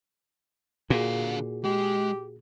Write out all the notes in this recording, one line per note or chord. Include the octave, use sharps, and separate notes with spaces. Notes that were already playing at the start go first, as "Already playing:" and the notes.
A#2 D3 F#4 G#4 F5
G#3 G4